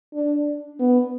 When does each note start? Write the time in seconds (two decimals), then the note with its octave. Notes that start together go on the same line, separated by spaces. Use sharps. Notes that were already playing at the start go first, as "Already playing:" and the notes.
0.14 D4
0.80 B3